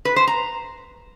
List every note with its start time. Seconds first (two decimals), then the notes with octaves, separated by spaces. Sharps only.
0.05 B4
0.16 C5
0.27 A#5